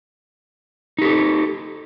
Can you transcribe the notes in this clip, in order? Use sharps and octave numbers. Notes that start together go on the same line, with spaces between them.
D#4 G4 A4